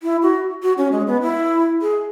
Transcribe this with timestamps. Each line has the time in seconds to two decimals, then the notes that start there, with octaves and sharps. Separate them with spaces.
0.03 E4
0.23 F#4
0.63 F#4
0.78 C#4
0.92 G#3
1.07 B3
1.22 E4
1.82 G#4